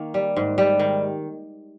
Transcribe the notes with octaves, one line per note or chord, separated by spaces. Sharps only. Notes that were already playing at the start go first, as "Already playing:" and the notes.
Already playing: D#3 A#3
G3
G#2
G3
D#3